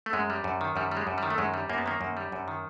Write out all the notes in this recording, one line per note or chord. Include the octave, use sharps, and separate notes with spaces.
A3
F#2 G#3
G3
F#2
D#3
F#2 G3
G3
G#3
F#2
G3
D#3
A3
F#2 G#3
G3
F#2 A#3
B3
D#3 A#3
F#2
G3
F#2
D#3